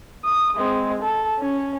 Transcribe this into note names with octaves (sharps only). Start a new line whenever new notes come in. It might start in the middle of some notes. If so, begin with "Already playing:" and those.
D#6
G#3 C4
A4
C#4